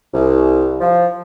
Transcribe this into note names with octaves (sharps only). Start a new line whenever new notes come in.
C2
F3